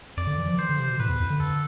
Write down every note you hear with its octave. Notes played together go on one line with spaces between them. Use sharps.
F2 D5
D3
E3
F3
E3 C5
D3
C3
B2
A2 B4
E2
F2
D3
A4